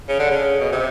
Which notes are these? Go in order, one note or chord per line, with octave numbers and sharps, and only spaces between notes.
C#3
D3
C#3
B2
C3